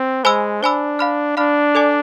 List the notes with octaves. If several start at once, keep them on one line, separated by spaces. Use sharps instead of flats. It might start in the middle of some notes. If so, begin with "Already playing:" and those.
Already playing: C4
G#3 C5 G#5 B5 E6
D4 C5 G#5 B5 E6
F5 B5 F6
D4 F5 B5 F6
A4 D5 G#5 D6